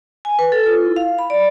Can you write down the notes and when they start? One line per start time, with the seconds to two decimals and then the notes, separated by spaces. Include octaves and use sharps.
0.25 G#5
0.39 B4
0.52 A4
0.66 F4
0.85 E4
0.96 F5
1.19 B5
1.30 D5